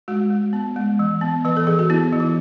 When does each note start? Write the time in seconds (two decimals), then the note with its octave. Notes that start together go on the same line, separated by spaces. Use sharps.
0.08 G#3 F#4
0.30 G#3
0.53 B3
0.76 G#3
0.99 E3
1.21 B3
1.44 E3 B4
1.57 A4
1.67 E3 G#4
1.79 F#4
1.90 B3 E4
2.13 E3
2.20 E4